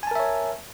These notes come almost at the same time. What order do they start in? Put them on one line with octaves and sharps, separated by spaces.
G#5 A5 A#4 E5 C#5